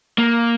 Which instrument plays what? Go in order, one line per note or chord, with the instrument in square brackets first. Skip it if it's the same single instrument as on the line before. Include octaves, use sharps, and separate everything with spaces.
[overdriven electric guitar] A#3